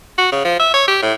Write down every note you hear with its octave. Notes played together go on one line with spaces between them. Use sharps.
F#4
C#3
F3
E5
C#5
G4
A2